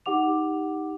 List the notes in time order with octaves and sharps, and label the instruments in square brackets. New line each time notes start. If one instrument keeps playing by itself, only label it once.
[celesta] D#4 G4 F#5 D6 F7